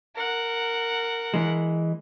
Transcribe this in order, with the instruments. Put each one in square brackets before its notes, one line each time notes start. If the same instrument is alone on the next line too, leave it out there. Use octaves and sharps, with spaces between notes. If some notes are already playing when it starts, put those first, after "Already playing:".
[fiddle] A#4 F#5
[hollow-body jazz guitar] E3 G#3